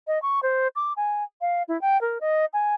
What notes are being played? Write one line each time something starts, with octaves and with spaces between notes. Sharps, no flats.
D#5
C#6
C5
D6
G#5
F5
E4
G5
A#4
D#5
G#5